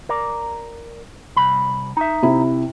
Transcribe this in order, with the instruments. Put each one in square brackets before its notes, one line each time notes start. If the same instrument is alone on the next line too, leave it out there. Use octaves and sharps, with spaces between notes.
[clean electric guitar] A#4 D5
C2 B5
D#4 E5
[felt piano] C3 E4